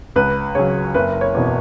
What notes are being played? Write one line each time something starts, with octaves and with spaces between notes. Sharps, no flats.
C#2 B4
C#3 F#3 C#5
F#1 B4
C#5
E2 B2